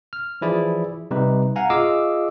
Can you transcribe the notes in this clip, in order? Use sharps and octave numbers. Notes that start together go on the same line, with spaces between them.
F6
E3 F3 E4 G#4 D5
C3 G3 D#4 G4 B4
F5 F#5 G#5 A#5
F4 G#4 D#5 F5 D6 E6